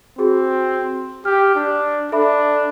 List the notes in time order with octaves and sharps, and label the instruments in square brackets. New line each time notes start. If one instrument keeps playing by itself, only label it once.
[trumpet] C4 [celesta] F#4 G#4
[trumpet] G4 [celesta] F6
[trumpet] D4
[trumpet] D4 [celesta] A4 E5 B5